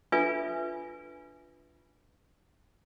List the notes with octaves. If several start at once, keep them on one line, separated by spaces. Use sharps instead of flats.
D4 F4 A4 B4 E5 G#5